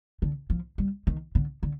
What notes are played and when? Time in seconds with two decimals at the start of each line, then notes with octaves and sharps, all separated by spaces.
0.22 D3
0.50 F3
0.78 G3
1.07 D#3
1.35 D3
1.63 D3